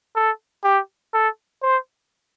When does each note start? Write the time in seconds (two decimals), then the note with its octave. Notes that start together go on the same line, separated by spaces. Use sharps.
0.16 A4
0.64 G4
1.14 A4
1.62 C5